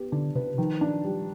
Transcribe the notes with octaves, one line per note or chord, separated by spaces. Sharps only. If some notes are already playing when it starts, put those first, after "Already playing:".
Already playing: B3 G4
D3 D4
C3 B4
D#3 F3
D4
G3